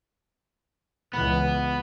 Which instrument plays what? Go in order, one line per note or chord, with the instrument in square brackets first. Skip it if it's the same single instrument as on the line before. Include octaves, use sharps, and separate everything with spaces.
[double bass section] C#2 E3 [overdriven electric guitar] B3